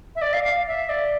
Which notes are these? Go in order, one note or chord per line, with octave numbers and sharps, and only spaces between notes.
E5
D5
F5
F5
E5
D5